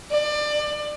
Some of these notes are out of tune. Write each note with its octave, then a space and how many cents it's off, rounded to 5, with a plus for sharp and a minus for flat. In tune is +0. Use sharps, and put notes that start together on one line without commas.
D5 +30